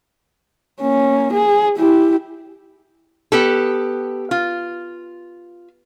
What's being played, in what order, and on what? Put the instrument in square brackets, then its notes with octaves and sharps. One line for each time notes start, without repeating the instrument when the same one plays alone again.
[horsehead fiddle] A#3 C#4
G#4
E4 G4
[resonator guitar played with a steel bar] B3 G4 A4
F4